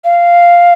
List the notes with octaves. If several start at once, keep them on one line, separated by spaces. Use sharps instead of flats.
F5